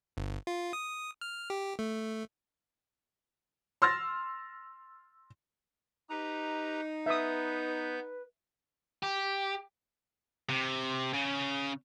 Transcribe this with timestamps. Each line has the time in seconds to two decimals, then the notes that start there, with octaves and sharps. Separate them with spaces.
0.17 G1
0.47 F4
0.73 D#6
1.21 F6
1.50 G4
1.79 A3
3.82 C6 E6 F6 A6 A#6
6.10 D#4 G4 B4 A#5
7.06 B3 B4 E5 D#6 G6
9.03 G4
10.49 C3
11.13 C#3